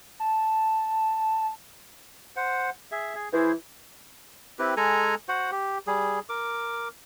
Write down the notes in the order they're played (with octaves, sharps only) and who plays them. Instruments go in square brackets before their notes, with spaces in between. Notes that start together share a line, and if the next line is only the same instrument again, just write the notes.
[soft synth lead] A5
[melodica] C5 F#5
G#4 E5
G#4
[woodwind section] E3 [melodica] E4 G#4 C5
[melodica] C4 E4 G4 B4
G#3 A4 G#5 A#5
F#4 C5 F#5
G4
G3 G#4
A#4 D6